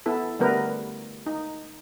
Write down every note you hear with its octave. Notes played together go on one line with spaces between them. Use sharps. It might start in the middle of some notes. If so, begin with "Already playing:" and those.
B3 E4 A4
D3 G3 A3 B3 A#4 B4
D#4